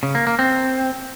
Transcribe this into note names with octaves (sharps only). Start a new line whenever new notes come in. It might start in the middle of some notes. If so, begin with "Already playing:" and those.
C#3
A#3
A#3
C4